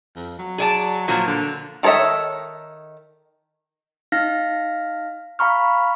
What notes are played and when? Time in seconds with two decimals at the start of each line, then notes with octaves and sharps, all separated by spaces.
0.16 F2
0.39 F#3
0.58 G#4 D5 A5
1.08 A#2 F3 F#3 A#3
1.27 D3
1.83 D#3 A4 C#5 D#5 E5
4.12 D#4 F5 F6 A#6
5.39 F5 A#5 B5 C#6 F6